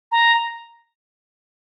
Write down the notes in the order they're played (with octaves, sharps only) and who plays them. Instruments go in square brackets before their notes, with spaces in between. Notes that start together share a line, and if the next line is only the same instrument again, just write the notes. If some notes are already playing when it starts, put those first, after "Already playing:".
[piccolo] A#5